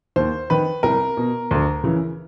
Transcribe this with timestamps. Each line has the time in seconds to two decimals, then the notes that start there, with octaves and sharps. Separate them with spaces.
0.16 D#2 C5
0.50 D#3 B4
0.83 C2 A#4
1.17 B2
1.51 D2
1.84 C#3 E3